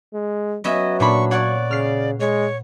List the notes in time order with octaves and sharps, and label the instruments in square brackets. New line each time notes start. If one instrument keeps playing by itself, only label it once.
[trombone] G#3
[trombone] F#3 [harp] B3 C#4 E5 [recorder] D#5
[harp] A#2 D4 B5 [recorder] C#6
[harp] C#5 F#5 C#6 [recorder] D5
[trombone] C#3 [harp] F6 C7
[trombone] G#3 [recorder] C#5